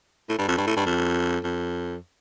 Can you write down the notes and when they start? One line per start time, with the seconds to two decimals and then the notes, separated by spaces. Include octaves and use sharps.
0.29 A2
0.38 G2
0.48 F2
0.57 G2
0.67 A2
0.76 G2
0.86 F2
1.44 F2